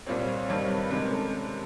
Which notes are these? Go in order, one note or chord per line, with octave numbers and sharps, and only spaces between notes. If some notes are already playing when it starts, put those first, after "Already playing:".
C2 A#2 G3 C4 C#5
C#5
G2 D#3 G3 C4 C#5
B4
C3 D#3 G#3 C#4 B4
A#4
A4